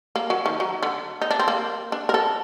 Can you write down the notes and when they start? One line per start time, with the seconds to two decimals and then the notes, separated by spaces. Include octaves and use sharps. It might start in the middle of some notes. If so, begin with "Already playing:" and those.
0.16 A#3
0.30 F#3
0.46 D#3
0.60 F#3
0.83 D3
1.22 D#4
1.31 D4
1.40 C4
1.48 A#3
1.92 D4
2.09 A#4
2.14 A4